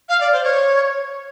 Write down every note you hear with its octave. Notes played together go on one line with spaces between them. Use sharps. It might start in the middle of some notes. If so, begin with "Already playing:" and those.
F5
D5
C5
C#5